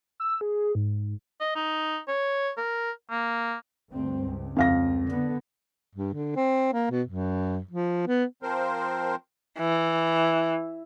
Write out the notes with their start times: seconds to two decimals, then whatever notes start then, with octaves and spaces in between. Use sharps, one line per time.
0.20 E6
0.41 G#4
0.75 G#2
1.40 D#5
1.55 D#4
2.08 C#5
2.58 A#4
3.10 A#3
3.92 D2 G2 C4
4.22 C#2
4.56 F2 F5 A#6
5.07 D3 B3
5.95 G2
6.14 D3
6.36 C4
6.73 A#3
6.91 B2
7.07 F#2
7.71 F3
8.07 B3
8.43 F3 C4 A#4 C5
9.59 E3